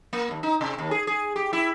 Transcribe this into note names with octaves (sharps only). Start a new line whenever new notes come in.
A#3
D#2
D#4
C3
D#2
G#4
G#4
G4
E4